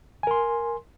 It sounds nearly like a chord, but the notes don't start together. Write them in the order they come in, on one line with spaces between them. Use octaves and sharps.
G#5 A#4 C6